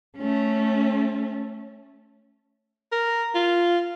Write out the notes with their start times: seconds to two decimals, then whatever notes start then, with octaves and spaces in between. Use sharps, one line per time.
0.17 A3 C#4
2.92 A#4
3.35 F4